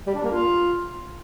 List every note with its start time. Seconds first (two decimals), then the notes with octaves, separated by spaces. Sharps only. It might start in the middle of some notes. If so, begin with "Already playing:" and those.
0.06 G3
0.15 D4
0.23 A#3
0.32 F4